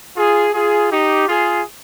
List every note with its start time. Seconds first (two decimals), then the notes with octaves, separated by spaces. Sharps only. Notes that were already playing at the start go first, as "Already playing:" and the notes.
0.16 F4 G#4
0.54 F4 G#4
0.91 D#4 G4
1.28 F4 G#4